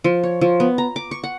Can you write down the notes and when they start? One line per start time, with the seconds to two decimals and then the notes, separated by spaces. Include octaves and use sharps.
0.04 F3
0.23 C#5
0.41 F3
0.60 B3
0.78 A#5
0.96 D6
1.11 C#6
1.24 F#5